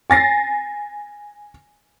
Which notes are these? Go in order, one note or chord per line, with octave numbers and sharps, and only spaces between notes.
G#5 A6 A#6 C7